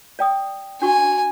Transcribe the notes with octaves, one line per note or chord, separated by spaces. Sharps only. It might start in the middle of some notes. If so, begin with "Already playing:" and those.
D5 G5 D#6
D4 F#4 G#5 C#6